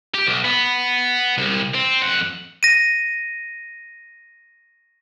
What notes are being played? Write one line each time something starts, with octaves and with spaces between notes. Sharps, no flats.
G4
B1
B3
C2
C4
F2 F#5
A#6 D#7